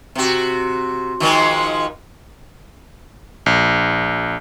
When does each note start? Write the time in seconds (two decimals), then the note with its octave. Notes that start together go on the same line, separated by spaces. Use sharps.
0.15 C3 F#4
1.20 D#3 F3 G#3
3.46 A#1